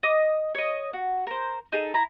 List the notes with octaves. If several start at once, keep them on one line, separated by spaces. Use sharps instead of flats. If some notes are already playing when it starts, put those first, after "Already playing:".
D#5 D6 D#6
C#5 D#5
F#4
A#4 C5
D#4 G#4 A4
E4 A#5